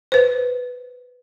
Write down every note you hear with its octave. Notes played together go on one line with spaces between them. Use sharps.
B4 C5